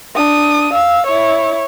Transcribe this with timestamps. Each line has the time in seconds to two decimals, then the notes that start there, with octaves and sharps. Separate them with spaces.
0.15 D4 D#6
0.74 F5 E6
1.07 E4 C#5